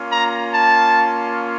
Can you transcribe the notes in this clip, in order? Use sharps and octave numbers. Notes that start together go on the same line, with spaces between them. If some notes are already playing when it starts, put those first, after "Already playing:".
Already playing: A#3 C#4 F4
A#5
A5